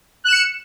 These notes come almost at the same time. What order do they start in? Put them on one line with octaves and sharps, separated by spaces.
F#6 E7 C#7